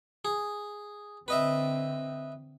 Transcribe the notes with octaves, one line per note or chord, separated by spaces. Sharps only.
G#4
D3 C4 B4 D#5 E5